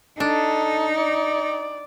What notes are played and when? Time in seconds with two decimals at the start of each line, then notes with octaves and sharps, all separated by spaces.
0.20 D4 D#4 A4
0.96 D5